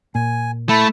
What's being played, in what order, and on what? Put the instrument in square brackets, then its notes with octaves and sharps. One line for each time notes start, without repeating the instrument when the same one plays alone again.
[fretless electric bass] A#2 [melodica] G#5
[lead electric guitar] A3 [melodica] E4 A5